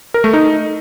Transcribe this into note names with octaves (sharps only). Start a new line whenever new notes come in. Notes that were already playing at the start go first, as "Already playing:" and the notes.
A#4
A3
D#4